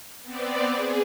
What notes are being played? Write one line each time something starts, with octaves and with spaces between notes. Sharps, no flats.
B3 C4 D5
G#4